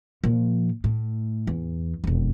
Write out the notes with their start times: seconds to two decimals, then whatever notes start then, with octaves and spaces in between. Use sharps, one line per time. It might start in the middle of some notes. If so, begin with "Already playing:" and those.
0.24 A#2 F3
0.84 A2
1.47 E2
2.04 E1 F2